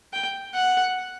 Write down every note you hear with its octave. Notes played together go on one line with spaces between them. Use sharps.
G5
F#5